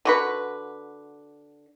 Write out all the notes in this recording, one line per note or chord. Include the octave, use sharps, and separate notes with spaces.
D3 F#4 B4